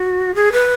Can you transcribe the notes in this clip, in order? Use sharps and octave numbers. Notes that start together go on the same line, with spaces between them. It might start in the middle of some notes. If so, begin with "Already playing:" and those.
Already playing: F#4
G#4
B4